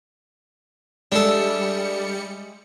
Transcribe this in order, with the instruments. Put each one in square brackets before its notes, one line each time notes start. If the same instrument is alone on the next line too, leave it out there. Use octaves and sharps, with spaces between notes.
[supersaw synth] G3 C#7 [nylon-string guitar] G#3 E5 [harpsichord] D4 A4